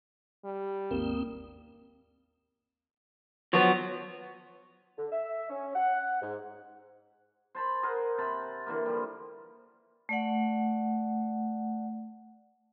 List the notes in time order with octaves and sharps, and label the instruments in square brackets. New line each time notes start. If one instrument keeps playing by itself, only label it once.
[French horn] G3
[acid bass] G#1 [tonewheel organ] D#2 C4 [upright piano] A#3
[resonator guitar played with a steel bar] F3 B3 [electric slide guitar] F#3 C#5
[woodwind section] D3
E5
C#4
F#5
G#2
[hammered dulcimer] C5 A5 B5
G#4 A#4 C5 F#5
C3 A5 B5
D3 E3 A#3
F3 G3
[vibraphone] A3 D5 F#5